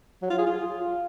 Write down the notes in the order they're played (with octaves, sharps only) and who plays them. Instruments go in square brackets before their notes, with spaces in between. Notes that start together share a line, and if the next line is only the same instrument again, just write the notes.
[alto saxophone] F#3
F4
G#4
F4